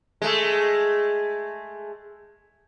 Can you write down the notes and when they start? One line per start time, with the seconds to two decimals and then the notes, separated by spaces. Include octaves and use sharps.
0.22 G#3 A3